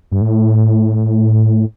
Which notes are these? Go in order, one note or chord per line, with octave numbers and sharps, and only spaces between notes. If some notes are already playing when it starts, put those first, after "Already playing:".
G2
A2